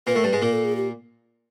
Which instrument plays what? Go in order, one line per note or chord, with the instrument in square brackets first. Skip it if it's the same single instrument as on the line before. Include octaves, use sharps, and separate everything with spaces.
[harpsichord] A#2 A#3 [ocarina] B4
[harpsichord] A2 A3 [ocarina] A#4
[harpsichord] G2 G3 [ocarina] B4
[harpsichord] G#2 G#3
[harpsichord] A#2 A#3 [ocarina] A#4
[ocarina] A4
G#4
G4